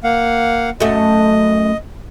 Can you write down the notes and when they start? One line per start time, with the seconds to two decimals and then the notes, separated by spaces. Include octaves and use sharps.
0.04 A#3 F5 F#5
0.80 F#2 A3 D#5